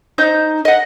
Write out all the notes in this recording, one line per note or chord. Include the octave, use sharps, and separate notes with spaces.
D#4 C5 G6
D#5 F#5